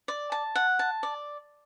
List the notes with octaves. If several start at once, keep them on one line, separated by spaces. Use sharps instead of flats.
D5
A5
F#5
A5
D5